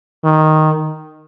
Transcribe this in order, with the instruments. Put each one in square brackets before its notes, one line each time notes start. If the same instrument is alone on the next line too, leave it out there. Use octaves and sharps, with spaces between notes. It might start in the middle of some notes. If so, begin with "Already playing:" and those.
[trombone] D#3